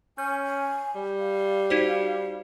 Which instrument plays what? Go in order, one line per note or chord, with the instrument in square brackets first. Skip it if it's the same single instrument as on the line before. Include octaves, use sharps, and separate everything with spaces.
[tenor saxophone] C#4 [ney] G#5 [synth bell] G6
[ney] G#5
[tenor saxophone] G3
[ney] F5
[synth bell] D#4 F#4 C5